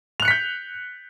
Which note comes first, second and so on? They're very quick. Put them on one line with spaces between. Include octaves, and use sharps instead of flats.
F7 F#6 C#7 B6 G6